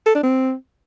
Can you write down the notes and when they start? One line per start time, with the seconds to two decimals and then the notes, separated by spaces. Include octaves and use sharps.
0.06 A4
0.15 D4
0.23 C4